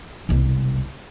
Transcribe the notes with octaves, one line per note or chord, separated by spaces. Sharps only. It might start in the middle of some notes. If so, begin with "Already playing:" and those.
E1 C2